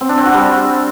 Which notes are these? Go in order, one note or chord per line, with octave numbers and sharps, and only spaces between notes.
C4
D4
C4
F#4
G3